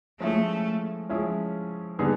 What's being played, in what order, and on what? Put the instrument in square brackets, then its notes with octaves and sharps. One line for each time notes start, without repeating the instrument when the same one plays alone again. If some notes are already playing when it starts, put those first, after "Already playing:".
[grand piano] F3 G#3 C#4 E4 [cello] A3
[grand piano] F3 G#3 C#4 E4
D3 G3 B3 D#4 G#4